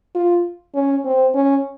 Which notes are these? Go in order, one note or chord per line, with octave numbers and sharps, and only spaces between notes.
F4
C#4
C4
C#4